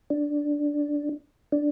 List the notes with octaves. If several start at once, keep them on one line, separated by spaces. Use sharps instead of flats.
D4
D4